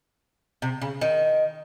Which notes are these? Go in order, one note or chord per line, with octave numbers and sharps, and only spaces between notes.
C3
C#3
D#3